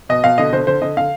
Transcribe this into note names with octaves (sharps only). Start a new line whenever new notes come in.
B2 D#5
B2 F5
D3 D#5
D3 C5
D3 C5
D3 D#5
D3 F5